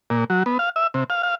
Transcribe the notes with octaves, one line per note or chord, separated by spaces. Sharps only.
A#2
F#3
B3
F5
E5
C3
F5
F5